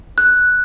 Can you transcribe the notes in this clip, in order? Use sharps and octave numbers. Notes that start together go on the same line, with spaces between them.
F#6